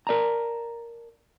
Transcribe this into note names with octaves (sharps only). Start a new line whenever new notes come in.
A#4 D5 A5 A#5